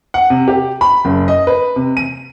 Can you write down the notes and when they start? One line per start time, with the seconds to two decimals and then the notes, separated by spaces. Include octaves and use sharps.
0.14 F#5
0.30 C3
0.48 G4
0.81 B5
1.05 F#1
1.28 D#5
1.47 B4
1.76 C3
1.97 D#7